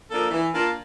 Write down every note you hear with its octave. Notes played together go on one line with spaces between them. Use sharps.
F3 A#3 D4 A4
E3
A#3 D4 F4